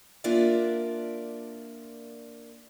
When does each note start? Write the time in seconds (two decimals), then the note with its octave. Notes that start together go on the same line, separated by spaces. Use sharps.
0.24 A#3 D4 F4 A#4 D5 E5